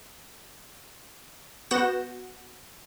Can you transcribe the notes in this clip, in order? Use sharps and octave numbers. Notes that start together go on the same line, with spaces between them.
B3 F#4 F#5 G6 A#6 E7